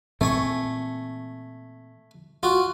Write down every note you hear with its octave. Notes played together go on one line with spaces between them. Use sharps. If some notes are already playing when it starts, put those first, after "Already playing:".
A#2 E3 A3 C4 G#5 C#6
F4 F#4